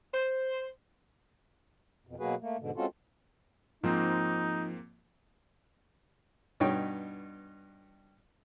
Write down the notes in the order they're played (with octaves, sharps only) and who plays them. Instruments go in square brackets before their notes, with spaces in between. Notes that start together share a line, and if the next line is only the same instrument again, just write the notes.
[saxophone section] C5
[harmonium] F2 B2
B2 F#3 A#3 F#4 G#4 B4
A3 A#3
G#2 B2 D3
G#3 C4 C#4 F4 F#4 A4
[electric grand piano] G#2 A#3 C4 [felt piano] F3 [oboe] D#4
[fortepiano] G2 B2 D#4 C#5 G5